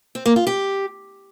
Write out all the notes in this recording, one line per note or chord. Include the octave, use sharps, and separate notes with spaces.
C4
A#3
F4
G4